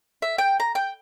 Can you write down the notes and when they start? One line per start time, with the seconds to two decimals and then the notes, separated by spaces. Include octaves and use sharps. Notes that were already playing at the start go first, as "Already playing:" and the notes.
0.22 E5
0.38 G5
0.60 A#5
0.75 G5